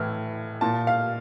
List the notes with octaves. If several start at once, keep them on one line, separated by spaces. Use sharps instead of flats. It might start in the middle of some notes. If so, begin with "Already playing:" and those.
Already playing: A2 E3 F6
A#2 A5
F5